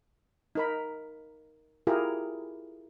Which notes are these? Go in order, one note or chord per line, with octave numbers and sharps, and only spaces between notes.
D#4 A#4 B5
E4 F4 G4 G#4 A#4